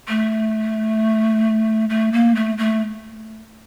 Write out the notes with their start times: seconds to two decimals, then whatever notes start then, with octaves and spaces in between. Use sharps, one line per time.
0.09 A3
1.90 A3
2.12 A#3
2.35 A3
2.58 A3